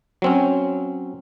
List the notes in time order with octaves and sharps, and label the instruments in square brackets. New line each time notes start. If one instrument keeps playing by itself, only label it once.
[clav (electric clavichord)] F#3 C4 C#4